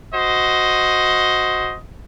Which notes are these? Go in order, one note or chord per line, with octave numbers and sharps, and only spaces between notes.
F#4 C5 D#5